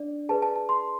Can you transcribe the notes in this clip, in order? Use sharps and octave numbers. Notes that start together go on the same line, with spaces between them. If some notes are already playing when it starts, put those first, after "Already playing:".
Already playing: D4 D5
G#4 B4 D5 A5
A5
A5
C6